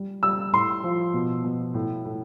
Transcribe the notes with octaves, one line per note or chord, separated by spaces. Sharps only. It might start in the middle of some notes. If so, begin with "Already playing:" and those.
Already playing: G3
G3 E6
A2 C6
F3
B2
B2
A2
A2